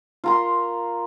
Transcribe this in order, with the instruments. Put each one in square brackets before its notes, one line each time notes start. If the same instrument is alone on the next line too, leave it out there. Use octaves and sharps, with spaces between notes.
[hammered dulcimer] F4 A#4 C6